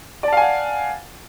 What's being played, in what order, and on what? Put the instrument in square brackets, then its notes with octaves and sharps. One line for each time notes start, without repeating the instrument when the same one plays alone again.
[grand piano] D5
A5
F5
G#5
F#5